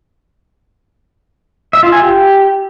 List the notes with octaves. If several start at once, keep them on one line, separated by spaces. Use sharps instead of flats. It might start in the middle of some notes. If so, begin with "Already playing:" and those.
E5
F4
G#5
G4